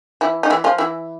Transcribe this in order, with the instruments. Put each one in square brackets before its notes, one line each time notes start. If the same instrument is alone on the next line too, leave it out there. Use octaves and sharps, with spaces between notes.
[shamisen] E3 E4
D#4
E3 E4
F3 F4
E3 E4